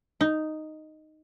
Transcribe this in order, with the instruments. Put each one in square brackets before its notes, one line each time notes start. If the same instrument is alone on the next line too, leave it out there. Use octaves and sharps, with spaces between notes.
[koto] D#4